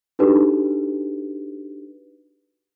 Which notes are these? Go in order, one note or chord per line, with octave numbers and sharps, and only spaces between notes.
D4 D#4 F#4 G4 A4 B4